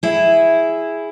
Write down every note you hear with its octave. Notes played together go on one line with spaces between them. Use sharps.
E4 G#4